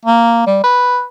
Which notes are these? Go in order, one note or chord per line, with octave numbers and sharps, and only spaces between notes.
A#3
G3
B4